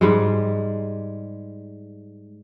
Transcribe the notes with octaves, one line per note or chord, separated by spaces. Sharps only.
G#2 G3 G#3